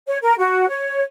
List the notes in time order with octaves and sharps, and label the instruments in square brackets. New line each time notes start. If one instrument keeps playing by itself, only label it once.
[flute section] C#5
A#4
F#4
C#5